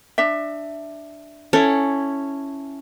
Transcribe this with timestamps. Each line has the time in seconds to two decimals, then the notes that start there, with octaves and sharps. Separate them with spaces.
0.18 D4 E5
1.53 C#4 E4 A4